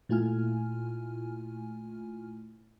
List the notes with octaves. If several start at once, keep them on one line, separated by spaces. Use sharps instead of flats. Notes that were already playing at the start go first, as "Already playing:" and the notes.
A#2 A3 E4 F4 G#5 F6